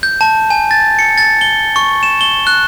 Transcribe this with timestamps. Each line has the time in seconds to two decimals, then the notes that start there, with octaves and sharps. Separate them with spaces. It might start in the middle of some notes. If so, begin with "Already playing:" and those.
0.03 G6
0.21 A5
0.50 G#5
0.71 A6
0.99 C#7
1.18 A6
1.41 G7
1.76 C#6
2.03 E7
2.21 G7
2.47 F#6